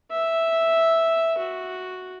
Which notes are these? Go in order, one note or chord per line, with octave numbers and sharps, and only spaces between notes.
E5
F#4